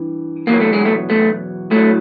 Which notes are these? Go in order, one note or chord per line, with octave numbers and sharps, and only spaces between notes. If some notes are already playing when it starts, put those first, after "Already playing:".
Already playing: G2 E3
E2 B2 F#3 A#3
A3
G#3
A3
A3
A2 F#3 A3